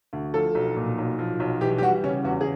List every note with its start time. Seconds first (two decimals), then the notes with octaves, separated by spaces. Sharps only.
0.13 D2
0.34 F3 A4
0.55 B1
0.76 A#2
0.98 B1
1.19 F3
1.40 B1
1.61 E3 G4
1.78 G4
1.82 G3 F#4
2.04 C#3 C#4
2.25 E2 F#4
2.41 G#4